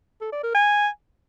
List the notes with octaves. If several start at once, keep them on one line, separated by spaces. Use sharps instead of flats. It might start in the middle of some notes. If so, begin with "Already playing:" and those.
A4
D5
A#4
G#5